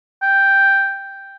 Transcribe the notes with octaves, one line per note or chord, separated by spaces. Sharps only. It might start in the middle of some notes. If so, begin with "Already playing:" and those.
G5